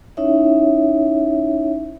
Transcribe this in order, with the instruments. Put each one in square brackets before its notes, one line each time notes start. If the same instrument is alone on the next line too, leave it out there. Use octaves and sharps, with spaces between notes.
[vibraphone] C#4 D#4 E4 C#5 E5